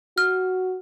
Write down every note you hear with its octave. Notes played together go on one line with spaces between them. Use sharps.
F#4 F6